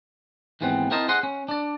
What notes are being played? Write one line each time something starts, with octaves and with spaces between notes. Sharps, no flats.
D#2 G#2 E3 B3 C4
C4 E4 A#4 C5 D#5 A5
G#4 C5 D#5 F#5 C6
C#4
D4 D5